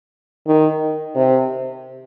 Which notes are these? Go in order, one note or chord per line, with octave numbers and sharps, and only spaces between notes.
D#3
C3